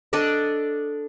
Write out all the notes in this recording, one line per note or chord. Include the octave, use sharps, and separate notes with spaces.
D4 A4 D5 D#5